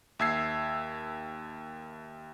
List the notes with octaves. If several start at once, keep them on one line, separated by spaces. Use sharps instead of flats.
D#2 E5 E6 G#6 C7